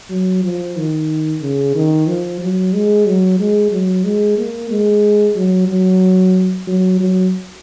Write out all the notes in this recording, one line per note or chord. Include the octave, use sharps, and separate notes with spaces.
F#3
F3
D#3
C#3
D#3
F3
F#3
G#3
F#3
G#3
F#3
G#3
A#3
G#3
F#3
F#3
F#3
F#3